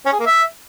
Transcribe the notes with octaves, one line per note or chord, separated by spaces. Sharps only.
C#4
G#4
A#3
E5